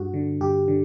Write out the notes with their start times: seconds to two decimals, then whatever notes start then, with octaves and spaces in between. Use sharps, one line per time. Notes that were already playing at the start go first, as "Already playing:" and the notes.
Already playing: G2 F#4
0.14 D3
0.41 G2 G4
0.68 D3